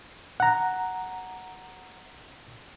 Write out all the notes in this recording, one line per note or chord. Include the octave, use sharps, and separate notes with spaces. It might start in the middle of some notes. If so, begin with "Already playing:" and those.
F#5 A#5